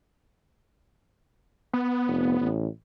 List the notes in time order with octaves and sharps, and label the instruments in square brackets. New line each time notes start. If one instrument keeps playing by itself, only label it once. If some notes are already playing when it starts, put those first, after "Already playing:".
[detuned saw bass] B3
[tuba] F1
A1